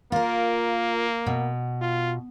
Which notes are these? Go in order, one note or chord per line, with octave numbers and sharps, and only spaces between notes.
A#3 F4 A#4
B2
F4